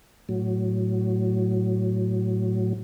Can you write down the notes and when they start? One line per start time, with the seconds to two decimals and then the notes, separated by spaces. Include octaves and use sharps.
0.29 A2 F#3